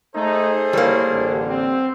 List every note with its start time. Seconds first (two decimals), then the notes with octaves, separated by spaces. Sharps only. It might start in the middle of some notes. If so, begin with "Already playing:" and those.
0.15 A3 D#4 G#4 A4 C5
0.73 G3 A#3 E4 A#4 C#5
1.12 A1 D3
1.47 C4